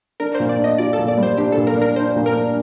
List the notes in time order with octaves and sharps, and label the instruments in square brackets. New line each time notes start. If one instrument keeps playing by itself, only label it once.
[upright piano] D4 [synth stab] A#4
[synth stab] C5
[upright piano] A#2
[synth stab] D5
[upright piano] D4
[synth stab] D#5
[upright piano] F4 [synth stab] D5
[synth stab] A4
[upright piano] A#2
[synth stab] D5
[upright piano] G3
[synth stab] C5
[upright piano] D4 [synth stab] G4
[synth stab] A4
[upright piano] A#2
[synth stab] A#4
[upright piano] D4
[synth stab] A#4
[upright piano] D4 [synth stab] C5
[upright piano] A#2
[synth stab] A#4
[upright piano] D4